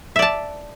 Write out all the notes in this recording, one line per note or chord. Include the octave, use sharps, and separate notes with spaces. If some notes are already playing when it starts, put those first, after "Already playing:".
D5 E5 A5